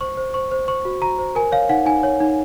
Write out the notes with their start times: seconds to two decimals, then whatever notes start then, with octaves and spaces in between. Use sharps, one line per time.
0.01 C5 C#6
0.17 C5
0.34 C5 C#6
0.51 C5
0.68 C5 C#6
0.85 F#4
1.02 F#4 A#5
1.18 C5
1.35 A#4 G#5
1.52 C#5 F5
1.69 D#4 F#5
1.86 D#4 G#5
2.03 C#5
2.20 D#4